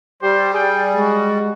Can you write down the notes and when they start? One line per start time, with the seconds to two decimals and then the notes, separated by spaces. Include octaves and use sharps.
0.22 G3 G4 C5
0.54 G#4 G5
0.96 G#3 F#4